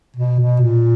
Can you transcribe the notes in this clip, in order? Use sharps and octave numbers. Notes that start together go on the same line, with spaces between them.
B2
B2
A#2